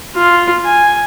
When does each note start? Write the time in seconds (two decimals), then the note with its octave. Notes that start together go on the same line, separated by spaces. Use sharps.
0.16 F4
0.65 G#5